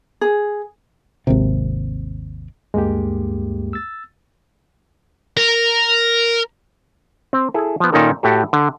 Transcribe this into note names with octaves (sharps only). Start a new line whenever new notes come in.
G#4
G#1 D#2 C3
D2 G2 G#3 A#3 G4
E6 A6
A#4
C4
E4 G#4 A4
F3 B3
A#2 D#3 C#4 D#4 A4 A#4
A2 F#4 G4 A4
D3